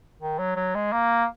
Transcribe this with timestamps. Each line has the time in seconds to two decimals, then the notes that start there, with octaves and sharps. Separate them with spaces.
0.20 D#3
0.38 F#3
0.56 F#3
0.75 G#3
0.92 A#3